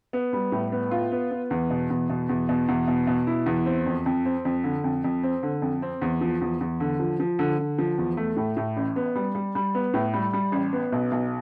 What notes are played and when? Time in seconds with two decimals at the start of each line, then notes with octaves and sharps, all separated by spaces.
0.13 B3
0.33 G3
0.52 A2
0.72 B3
0.91 F4
1.11 B3
1.31 B3
1.51 E2
1.70 B2
1.90 E2
2.09 B2
2.29 E2
2.49 B2
2.68 E2
2.88 B2
3.07 B2
3.27 E4
3.46 E2
3.66 C4
3.86 F2
4.06 F2
4.25 C4
4.45 F2
4.64 D3
4.84 F2
5.04 F2
5.24 C4
5.43 D3
5.62 F2
5.82 C4
6.02 E2
6.21 F3
6.41 E2
6.61 E2
6.80 D3
7.00 F3
7.20 F3
7.39 D3
7.58 D3
7.78 F3
7.98 E2
8.17 A3
8.36 A2
8.57 A2
8.77 A1
8.96 B3
9.15 G3
9.35 G3
9.55 G3
9.75 B3
9.94 A2
10.14 G3
10.33 G3
10.52 A1
10.73 B3
10.92 B1
11.12 B1